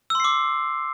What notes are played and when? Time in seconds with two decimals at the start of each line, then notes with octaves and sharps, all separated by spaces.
0.10 E6
0.15 C6
0.20 C7
0.25 D6